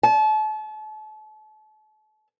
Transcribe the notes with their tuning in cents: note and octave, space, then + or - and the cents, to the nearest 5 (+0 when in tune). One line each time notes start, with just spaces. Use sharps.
A5 -35